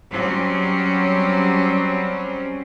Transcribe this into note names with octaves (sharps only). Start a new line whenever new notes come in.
F#3 G3 C4 C#4